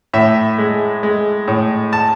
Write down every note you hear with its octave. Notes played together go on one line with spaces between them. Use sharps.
A2 E5
G#3
G#3
A2
A5